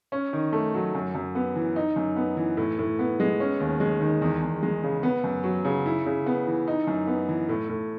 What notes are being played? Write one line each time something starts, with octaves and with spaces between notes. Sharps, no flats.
C#4
D#3
A3
F#3
F#2
F#2
B3
E3
D#4
F#2
B3
E3
A2
A2
B3
G#3
C#4
D#2
G#3
D#3
E2
E2
G#3
C#3
B3
F#2
F#3
C#3
E4
C#3
B3
E3
D#4
F#2
B3
E3
A2
A2